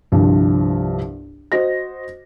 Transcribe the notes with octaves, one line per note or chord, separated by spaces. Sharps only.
G1 C2 G2 F3
F#4 C5 D#5 A#6